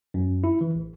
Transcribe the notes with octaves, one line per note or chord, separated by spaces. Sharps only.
F#2
E4
E3
A1